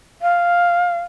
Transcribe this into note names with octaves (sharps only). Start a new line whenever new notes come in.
F5